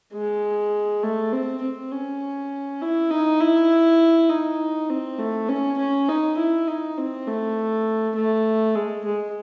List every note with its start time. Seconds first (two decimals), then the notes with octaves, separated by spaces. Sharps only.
0.14 G#3
1.03 A3
1.33 C4
1.62 C4
1.92 C#4
2.82 E4
3.11 D#4
3.41 E4
4.29 D#4
4.90 C4
5.19 A3
5.49 C#4
5.78 C#4
6.09 D#4
6.37 E4
6.68 D#4
6.98 C4
7.28 A3
8.16 A3
8.75 G#3
9.05 G#3